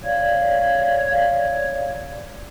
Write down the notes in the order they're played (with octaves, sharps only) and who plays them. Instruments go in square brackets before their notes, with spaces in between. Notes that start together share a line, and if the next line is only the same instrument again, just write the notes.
[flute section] C#5 D5 F5 G#6